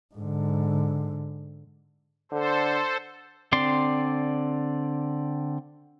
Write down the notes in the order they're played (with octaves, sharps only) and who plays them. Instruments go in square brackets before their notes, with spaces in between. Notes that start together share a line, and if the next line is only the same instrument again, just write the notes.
[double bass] G#2 D3
[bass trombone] D3 [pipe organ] A4 C5
[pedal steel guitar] D3 C4 D5 C6